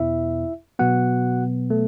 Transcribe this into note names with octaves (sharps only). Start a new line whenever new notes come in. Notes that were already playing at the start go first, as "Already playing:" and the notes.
Already playing: E2 B2 B3 E4 E5
B2 F#3 B3 F#4 F#5
A3 A4